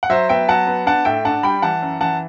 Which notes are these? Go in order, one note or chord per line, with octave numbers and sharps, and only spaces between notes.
F#5
F#3 C5 E5
B3 E5 G5
F#3 F#5 A5
B3
D4 F#5 A5
A2 E5 G5
D4 F#5 A5
G3 G5 B5
E3 F#5 A5
F#2
E3 F#5 A5